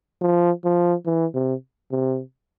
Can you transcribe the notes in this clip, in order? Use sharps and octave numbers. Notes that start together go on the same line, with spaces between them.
F3
F3
E3
C3
C3